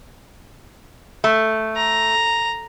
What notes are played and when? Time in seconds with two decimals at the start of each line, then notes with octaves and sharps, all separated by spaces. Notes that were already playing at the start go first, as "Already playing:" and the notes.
1.24 A3
1.77 A#5